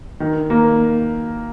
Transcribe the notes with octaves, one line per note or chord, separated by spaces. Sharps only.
D#3
A#3